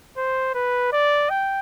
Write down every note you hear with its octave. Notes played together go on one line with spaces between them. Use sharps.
C5
B4
D5
G5